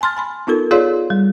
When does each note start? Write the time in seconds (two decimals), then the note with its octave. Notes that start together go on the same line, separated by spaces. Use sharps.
0.01 G#5 A5 C6 F6 A6
0.17 G#5 B5 C6
0.47 B3 D#4 F4 A4 A#4
0.71 F4 G#4 C#5 D5 F5 C6
1.10 G3